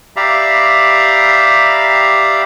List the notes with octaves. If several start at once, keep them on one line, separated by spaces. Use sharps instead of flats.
G4 D5 E5 F5 A#5 B5